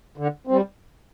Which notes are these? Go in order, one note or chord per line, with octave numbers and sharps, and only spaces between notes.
D3
G3 C4